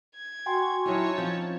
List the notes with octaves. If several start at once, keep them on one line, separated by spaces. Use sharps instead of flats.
G#6
F#4 G5 G#5 C6
F#3 C#4 D#4 E4 C#5 A5
F3 C4 G6